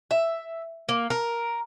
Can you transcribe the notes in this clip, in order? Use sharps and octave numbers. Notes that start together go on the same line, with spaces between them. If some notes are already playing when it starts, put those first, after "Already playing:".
E5
A#3
A#4